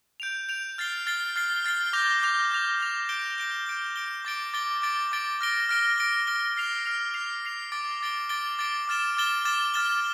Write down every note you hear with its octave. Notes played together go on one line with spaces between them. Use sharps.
G6 D7 F7
G6 D7 F7
F6 A6 C7 G7
F6 A6 C7 G7
F6 A6 C7 G7
F6 A6 C7 G7
D6 G6 A#6 F7
D6 G6 A#6 F7
D6 G6 A#6 F7
D6 G6 A#6 F7
G6 D7 G7
G6 D7 G7
G6 D7 G7
G6 D7 G7
D6 A6 D7 G7
D6 A6 D7 G7
D6 A6 D7 G7
D6 A6 D7 G7
F6 A#6 D7 G7
F6 A#6 D7 G7
F6 A#6 D7 G7
F6 A#6 D7 G7
F6 C7 F7
F6 C7 F7
F6 C7 F7
F6 C7 F7
D6 A6 D7 G7
D6 A6 D7 G7
D6 A6 D7 G7
D6 A6 D7 G7
D6 F6 A6 E7 G7
D6 F6 A6 E7 G7
D6 F6 A6 E7 G7
D6 F6 A6 E7 G7